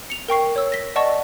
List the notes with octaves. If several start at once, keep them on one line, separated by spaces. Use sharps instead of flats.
C#7 F7
A#4 G5 C#6 C7
C#5 E6
A#6 B6
D5 D#5 F#5 A5 C#6